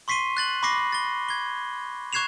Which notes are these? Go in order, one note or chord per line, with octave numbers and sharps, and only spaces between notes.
C6 C#6 B6 C7 D#7 G7
F#6 A6 F#7
B5 C#6 D6 A#6 C7
A6 G7
G#6 G7
C#6 F#6 G#6 C7 E7 F7